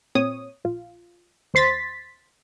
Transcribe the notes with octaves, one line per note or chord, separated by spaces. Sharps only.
A#2 C4 C#5 D#6
A#1 F4
D#2 C5 C6 A6 B6